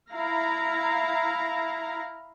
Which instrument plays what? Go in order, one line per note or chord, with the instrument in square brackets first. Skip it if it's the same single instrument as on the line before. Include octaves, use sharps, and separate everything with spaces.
[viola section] E4 F5 A#5